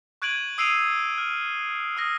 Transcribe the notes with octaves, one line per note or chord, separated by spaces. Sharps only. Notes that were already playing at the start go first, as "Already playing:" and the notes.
C#6 F#6 G#6 D7 D#7 F#7
D#6 E6 C7 D7 D#7 F7
F6
D#6 F6 A#6